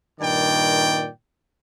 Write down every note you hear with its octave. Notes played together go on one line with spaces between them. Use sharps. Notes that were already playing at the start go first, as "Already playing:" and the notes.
G2 A#2 D#3 D5 G5